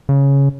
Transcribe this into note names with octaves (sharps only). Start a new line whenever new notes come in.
C#3